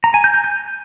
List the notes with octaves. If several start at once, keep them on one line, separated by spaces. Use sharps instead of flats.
A#5
G#5
G6
G6
G6